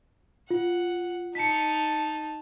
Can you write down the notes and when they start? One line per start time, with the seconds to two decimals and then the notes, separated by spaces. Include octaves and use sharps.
0.51 F4 F#5
1.35 D#4 A5 B6 C#7